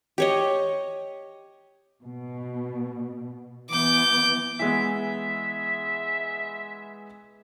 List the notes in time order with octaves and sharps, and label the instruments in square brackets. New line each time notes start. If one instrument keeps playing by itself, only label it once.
[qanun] G4 C#5 D#5
[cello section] B2
[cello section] E3 B3 [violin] D6 G6
[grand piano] E3 G#3 B3 [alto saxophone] E5